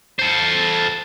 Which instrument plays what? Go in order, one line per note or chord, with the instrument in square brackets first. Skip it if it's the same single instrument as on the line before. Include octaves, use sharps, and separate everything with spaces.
[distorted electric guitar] A4 C5